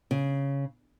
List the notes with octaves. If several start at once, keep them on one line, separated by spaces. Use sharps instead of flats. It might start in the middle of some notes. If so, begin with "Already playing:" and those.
C#3